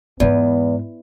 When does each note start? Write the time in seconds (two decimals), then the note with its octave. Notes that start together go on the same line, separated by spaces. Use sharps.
0.20 E2 G#2 G#3 B3